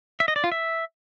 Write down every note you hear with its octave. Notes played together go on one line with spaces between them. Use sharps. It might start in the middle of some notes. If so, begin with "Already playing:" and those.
E5
D#5
D5
F4
E5